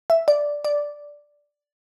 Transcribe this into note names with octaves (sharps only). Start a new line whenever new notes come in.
E5
D5
D5